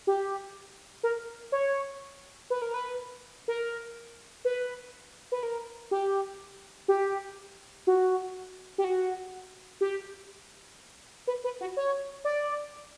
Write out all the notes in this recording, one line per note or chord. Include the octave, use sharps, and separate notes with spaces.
G4
A#4
C#5
B4
A#4
B4
A#4
B4
B4
A#4
G4
G4
F#4
G4
F#4
G4
B4
B4
F#4
C#5
D5